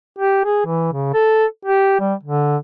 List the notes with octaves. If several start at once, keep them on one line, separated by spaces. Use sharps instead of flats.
G4
G#4
E3
C#3
A4
G4
G3
D3